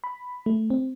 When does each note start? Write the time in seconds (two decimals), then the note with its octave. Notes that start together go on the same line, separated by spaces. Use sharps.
0.04 B5
0.46 A3
0.70 C4